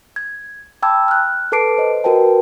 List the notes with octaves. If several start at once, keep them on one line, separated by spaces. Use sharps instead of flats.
G#6
G5 A5 B5 D6 E6 G#6
F6 F#6
A4 B4 A5 D6 C7 D7
C5 D#5
F#4 A#4 B4 G5 A5